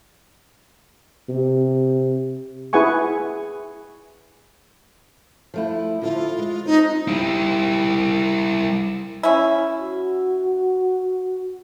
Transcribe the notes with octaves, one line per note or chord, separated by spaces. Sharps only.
C3
E4 G#4 B4 F#5 G#5 C#6
F3 A3 E4
D3 F3 E4 F4
G#3
C4 D4 D#4
G3 E4
C#4 E4
F#4